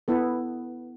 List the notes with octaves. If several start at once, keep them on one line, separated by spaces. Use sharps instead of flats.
B3 E4 A4